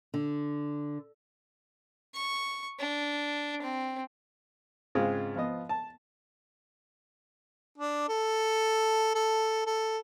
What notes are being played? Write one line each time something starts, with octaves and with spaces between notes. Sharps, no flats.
D3
C#6
D4
C4
G#2 C#3 G#3 C4 F4
F3 B3 D#5
A5
D4
A4
A4
A4